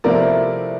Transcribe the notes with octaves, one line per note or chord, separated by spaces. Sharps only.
C3 F3 A3 E4 A#4 D5